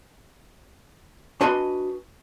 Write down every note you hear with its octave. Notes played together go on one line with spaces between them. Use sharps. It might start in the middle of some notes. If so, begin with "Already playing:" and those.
D4 F#4 B4 D#5 G#5 C6